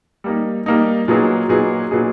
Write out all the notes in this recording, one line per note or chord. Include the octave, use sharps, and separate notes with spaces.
G3 A#3 D#4
G3 A#3 D#4
A#2 F#3 B3 D#4 G#4
A#2 F#3 B3 D#4 G#4
A#2 F#3 B3 D#4 G#4